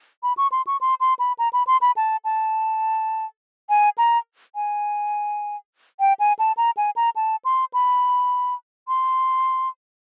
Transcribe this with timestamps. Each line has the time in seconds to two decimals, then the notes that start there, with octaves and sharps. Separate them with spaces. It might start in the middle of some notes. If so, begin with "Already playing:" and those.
0.23 B5
0.37 C#6
0.52 C6
0.67 C#6
0.81 C6
1.00 C6
1.19 B5
1.39 A#5
1.53 B5
1.67 C6
1.81 B5
1.97 A5
2.24 A5
3.69 G#5
3.98 A#5
4.55 G#5
6.00 G5
6.20 G#5
6.39 A5
6.57 A#5
6.77 G#5
6.96 A#5
7.16 A5
7.45 C6
7.73 B5
8.88 C6